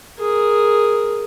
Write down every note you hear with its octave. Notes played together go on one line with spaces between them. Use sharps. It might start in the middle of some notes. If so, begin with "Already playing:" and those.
G#4 A#4